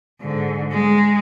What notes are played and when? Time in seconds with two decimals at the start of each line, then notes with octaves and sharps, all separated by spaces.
0.21 G#2 D3
0.71 G#3